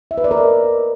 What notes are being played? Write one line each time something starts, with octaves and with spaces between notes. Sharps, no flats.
E5
B4
D5
A#4
D#5